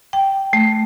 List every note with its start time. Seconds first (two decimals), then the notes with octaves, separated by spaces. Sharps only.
0.13 G5
0.53 A3